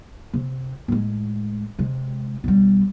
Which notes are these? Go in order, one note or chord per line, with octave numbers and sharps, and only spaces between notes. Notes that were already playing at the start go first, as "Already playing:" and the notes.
C3
A2 G#3
C3 G#3
B1 G3